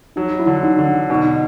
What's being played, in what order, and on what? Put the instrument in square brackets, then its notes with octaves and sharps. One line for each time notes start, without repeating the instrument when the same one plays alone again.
[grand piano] F#3 [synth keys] D#4
[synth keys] E4
[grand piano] D3
[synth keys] D#4
[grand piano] D3
[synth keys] D4
[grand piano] B2 [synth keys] D#4